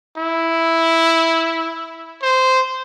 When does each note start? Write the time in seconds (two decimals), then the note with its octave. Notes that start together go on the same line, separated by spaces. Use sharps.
0.17 E4
2.22 C5